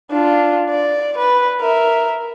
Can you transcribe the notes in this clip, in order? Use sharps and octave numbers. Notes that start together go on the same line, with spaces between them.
D4 F4
D5
B4
A#4 E5